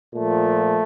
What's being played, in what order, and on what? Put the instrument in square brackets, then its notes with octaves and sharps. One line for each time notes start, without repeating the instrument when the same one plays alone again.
[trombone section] A#2 F3 A3